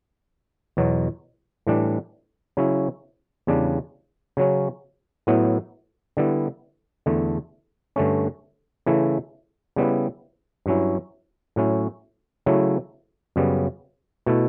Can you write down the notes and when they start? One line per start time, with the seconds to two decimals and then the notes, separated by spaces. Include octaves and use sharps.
0.77 E2 B2 F#3
1.67 A2 E3 G3 D4
2.57 C#3 F#3 C#4 E4
3.47 E2 C#3 G3 D4
4.37 C#3 F#3 C#4
5.27 A2 F#3 B3 E4
6.17 D3 G3 B3 E4
7.06 E2 D3 A3
7.96 G2 D3 A3 C#4
8.86 C#3 E3 A3 E4
9.76 C#3 G3 B3 E4
10.66 G2 F#3 C#4 E4
11.56 A2 F#3 C#4 E4
12.46 C#3 F#3 A3 E4
13.36 F#2 C#3 G3 B3
14.26 B2 A3 E4